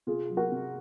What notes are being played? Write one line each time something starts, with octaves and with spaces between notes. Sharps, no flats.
C3 F4 G#4
F#3
F#4 A#4
C3